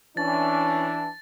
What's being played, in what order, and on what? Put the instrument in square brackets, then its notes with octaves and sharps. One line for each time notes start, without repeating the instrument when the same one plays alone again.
[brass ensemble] E3 D4 [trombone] C#4 [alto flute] A5 [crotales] A6